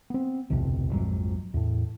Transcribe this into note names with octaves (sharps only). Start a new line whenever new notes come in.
B3 C4
D1 B1 F2 C3
A#1 F2 G#2 F#3
E2 A2